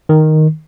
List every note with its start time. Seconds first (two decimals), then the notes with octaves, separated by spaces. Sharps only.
0.09 D#3